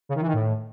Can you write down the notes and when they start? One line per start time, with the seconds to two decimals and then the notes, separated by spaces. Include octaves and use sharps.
0.09 C#3
0.15 D#3
0.21 E3
0.27 D#3
0.33 A2